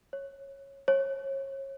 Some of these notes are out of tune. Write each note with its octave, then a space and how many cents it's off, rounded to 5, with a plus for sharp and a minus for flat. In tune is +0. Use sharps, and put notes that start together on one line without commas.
C#5 -10
C#5 -30